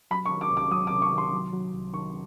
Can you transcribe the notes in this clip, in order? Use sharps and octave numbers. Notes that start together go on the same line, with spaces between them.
F#3 B5
C#6
D#3
D6
C2
D6
F#3 D#6
D6
C3
C#6
D#3
C6
F#3
F#3
C2
D#3 C#6